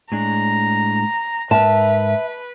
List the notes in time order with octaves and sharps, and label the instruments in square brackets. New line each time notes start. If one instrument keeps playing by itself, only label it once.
[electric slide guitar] A2 G#3 D4 [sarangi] A#5
[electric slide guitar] G#2 A#4 [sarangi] B4 [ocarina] E5 [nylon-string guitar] A5